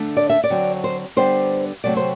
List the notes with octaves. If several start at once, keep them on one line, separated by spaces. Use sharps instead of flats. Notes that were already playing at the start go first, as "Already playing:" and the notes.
Already playing: D3 A3 D4
D5
E5
D5
D3 F#3 C4
C5
D3 G3 B3 D4 C5
C3 F#3 A3 C4 D5
C5